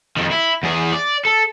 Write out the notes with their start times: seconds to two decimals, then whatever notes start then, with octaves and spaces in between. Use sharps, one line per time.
0.16 F2 D#3
0.31 E4
0.63 E2 G#4
0.92 D5
1.25 A4